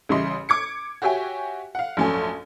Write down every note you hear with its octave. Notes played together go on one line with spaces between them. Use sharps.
A1 C#3 G3 D#5 E5 C6
D6 G#6 C#7
F#4 G4 C#5 E5 G5 G#5
F5 F#5
A#1 F#2 A3 C#4 G#5